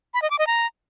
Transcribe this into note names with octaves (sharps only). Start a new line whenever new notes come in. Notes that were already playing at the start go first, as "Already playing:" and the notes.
B5
D#5
D6
D#5
A#5